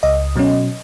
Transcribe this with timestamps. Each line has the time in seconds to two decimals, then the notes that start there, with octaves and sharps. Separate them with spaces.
0.03 C#2 D#5
0.36 B2 F#3 C#4